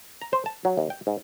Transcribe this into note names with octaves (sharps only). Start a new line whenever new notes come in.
A#5
C5
A5
F#3
D#2
G5
G#2